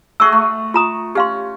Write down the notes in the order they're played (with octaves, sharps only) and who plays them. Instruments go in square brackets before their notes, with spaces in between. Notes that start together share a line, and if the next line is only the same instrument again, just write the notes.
[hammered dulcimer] A3 F#4 G#4 [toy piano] C#6 E6
[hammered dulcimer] A3
[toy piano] F4 A#5 D#6
[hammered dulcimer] C#4 [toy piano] G4 F5 C6